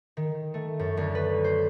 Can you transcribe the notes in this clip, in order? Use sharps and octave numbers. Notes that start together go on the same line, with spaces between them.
D#3
A3
F#2
D2
B4
C5